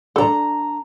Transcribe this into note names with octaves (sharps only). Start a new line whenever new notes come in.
D4 A4 D5 A#5